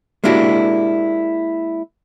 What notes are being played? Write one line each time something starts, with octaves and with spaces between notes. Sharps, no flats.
G#3 A#3 D4 E4 F#4 G4